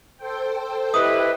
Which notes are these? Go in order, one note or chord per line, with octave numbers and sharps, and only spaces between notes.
A4 C5 G5
E4 G4 B4 D#5 D#6